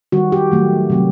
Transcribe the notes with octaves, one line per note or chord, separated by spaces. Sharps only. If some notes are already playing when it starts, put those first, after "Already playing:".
D#3 G3 F#4
G4
D#3 F#3 A3
C3 F#3 A3